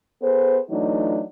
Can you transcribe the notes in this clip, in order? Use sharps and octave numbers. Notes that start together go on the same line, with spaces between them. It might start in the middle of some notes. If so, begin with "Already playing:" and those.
B3 G#4 A4 C5
E3 F#3 A3 D4 D#4